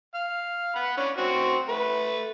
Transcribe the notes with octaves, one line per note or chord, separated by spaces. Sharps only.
F5
F#5 B5
C#4 D4
C4 F#4
A3 B4